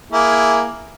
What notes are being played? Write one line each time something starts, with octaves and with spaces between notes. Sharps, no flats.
A#3 E4 G#4